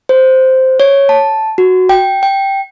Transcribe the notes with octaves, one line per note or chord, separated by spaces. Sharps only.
C5
C#5
A5
F#4
G5
G5